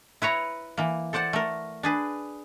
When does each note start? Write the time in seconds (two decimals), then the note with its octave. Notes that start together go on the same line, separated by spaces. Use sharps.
0.22 E4 B4 C#5 A#5
0.77 E3 A#3
1.13 A4 C5 D5 F#5 A5
1.33 A3 A#4
1.83 D4 G#4 B4